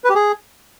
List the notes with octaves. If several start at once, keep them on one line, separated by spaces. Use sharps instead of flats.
B4
G4
G#4